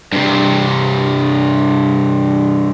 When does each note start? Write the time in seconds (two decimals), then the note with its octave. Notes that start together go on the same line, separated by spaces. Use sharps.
0.12 G2 C3